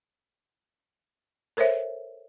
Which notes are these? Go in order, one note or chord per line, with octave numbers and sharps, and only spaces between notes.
A4 A#4 C5 C#5 E5